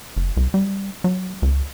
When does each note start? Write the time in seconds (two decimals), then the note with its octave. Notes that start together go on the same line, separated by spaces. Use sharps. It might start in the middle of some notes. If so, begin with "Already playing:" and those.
0.16 F#1
0.37 C2
0.54 G3
1.04 F#3
1.42 C#2